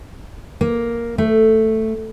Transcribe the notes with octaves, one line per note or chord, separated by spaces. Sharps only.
A#3
A3